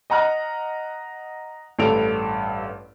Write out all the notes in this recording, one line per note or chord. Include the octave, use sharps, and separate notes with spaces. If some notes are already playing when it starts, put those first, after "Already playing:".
D#5 F#5 A#5 F6 F#6
A1 G2 A4 D7 F7